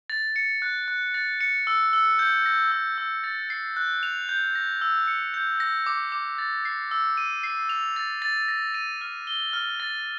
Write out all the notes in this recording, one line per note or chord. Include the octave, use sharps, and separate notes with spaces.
A6
C#7
F#6
F#6
A6
C#7
E6
E6
G6
A#6
E6
E6
A6
C7
F#6
F7
G6
A#6
E6
C#7
G6
A#6
D6
D6
A6
C7
E6
D#7
C7
F7
A6
A6
A#6
D#7
F6
G7
F6
A6